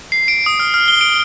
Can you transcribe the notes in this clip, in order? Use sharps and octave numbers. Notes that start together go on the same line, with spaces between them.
C7
D7
D#6
F6
F6
G7
D7